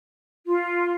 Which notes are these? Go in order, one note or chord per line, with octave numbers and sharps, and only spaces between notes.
F4